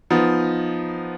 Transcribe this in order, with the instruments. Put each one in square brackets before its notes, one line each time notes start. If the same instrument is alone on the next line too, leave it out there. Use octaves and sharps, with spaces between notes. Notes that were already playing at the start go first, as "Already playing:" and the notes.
[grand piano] F3 B3 D#4